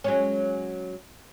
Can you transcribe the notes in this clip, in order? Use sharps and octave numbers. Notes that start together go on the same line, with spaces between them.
F#3 G#3 C#4